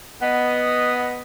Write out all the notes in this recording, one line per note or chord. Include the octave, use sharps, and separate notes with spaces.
B3 D#5